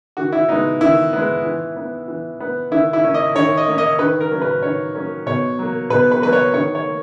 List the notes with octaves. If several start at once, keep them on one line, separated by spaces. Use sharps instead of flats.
D#3 F#4
E4
G#3 B3 D#4
D#3 E4
G#3 B3
E3
B3
E3
B3
D#3 E4
E4
A#3 C#4
D#5
D#3 C#5
D#5
A#3 C#4
D#5
D#3 B4
A#4
F#3 A#3 C#4
B4
D#3 C#5
F#3 A#3 C#4
B2 C#5
F#3 A#3
B2 B4
B4
F#3 A#3 B4
C#5
D#3 C#5
C#5
A#3